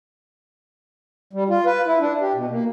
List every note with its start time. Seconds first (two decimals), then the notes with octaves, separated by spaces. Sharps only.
1.33 G3
1.49 F4
1.66 B4
1.86 E4
2.00 D4
2.21 G4
2.35 B2
2.50 A#3